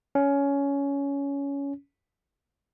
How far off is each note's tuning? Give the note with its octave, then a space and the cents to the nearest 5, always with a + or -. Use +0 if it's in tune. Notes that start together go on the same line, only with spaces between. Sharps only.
C#4 +15